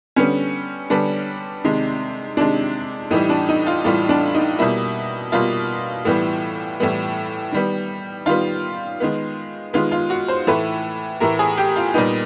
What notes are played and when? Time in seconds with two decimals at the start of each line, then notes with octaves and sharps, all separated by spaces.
0.16 D3 G3 B3 C#4
0.90 D3 G3 B3 D4
1.64 C3 D#3 G#3
2.37 C3 D#3 G#3 D4
3.11 A2 E3 G3 D#4
3.29 D4
3.49 D#4
3.67 F4
3.85 A2 E3 G3 F4
4.09 D4
4.35 D#4
4.59 B2 G3 A#3 E4
5.32 B2 G3 A#3 F4
6.05 A2 E3 G3 B3
6.80 A2 E3 G3 B3
7.52 D#3 G3 B3
8.26 D#3 G3 B3 F4
9.00 D#3 G#3 B3
9.73 D#3 G#3 B3 F4
9.92 F4
10.10 F#4
10.28 C5
10.47 A2 E3 A3 B4
11.20 A2 E3 A3 A#4
11.39 G#4
11.57 G4
11.76 F4
11.94 A#2 G3 B3 D#4